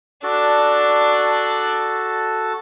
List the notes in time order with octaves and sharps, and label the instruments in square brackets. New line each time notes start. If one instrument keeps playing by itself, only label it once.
[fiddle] D4 [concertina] F#4 A4 A5